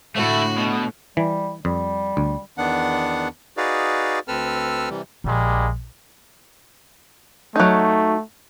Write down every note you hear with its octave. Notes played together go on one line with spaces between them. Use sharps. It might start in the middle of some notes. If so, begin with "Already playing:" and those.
A2 D3 A3 E4 F#4
B2
E3 G3
F2 G3
D2
E2 D#3 B3 D4 F#5
D#4 F#4 G#4 B4 D5 F5
D2 C4 A4 B4 E6 F6
C3 E3 G3
A#1 G3 G#3 A#3
F#3 A3 D#4